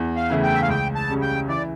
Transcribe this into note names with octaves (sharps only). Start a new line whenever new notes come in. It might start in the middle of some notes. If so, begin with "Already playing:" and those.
Already playing: E2
F5
C#3 E3 A3 E4
G5
E5
F5
C#2 G5
A5
C#3 G3 C#4
G5
E3 D5